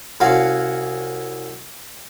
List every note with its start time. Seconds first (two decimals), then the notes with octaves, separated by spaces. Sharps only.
0.20 C2 C#4 F#4 F5 F#5